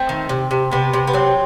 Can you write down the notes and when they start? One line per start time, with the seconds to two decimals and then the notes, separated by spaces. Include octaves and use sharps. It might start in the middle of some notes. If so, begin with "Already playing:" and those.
Already playing: A3 C4
0.09 D#3
0.29 C3
0.51 C3
0.71 C3 B3
0.94 C3
1.07 B3
1.13 F#3 C4